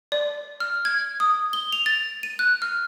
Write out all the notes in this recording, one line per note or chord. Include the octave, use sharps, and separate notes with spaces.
D5
F6
G#6
D#6
G7
F7
A6
D#7
F#6
F6